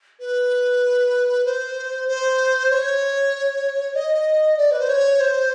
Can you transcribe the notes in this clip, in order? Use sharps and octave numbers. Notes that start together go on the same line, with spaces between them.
B4
C5
C5
C#5
D#5
D5
B4
C5
C#5
C5